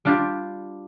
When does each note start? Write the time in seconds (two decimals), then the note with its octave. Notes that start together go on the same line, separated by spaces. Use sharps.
0.05 G3 D4 F4 G4